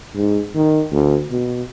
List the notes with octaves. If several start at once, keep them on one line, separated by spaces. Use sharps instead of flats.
G#2
D#3
D2
B2